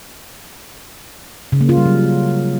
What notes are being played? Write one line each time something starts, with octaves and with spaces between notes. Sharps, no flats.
C#3
A#3
F4
G3
F#3